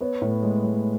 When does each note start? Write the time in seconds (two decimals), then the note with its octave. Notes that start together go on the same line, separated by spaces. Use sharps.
0.01 B3 C#5
0.22 A2
0.43 G#3
0.65 G#3